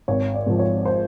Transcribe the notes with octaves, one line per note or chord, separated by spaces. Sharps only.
G#1 C#5
D5
G#2 F3
C#5
C5